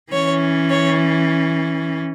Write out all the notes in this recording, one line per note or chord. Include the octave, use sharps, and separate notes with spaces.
E3 C#4 C#5
C#5